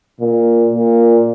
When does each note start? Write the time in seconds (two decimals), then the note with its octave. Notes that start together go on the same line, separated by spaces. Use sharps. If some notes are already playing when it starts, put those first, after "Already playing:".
0.20 A#2
0.73 A#2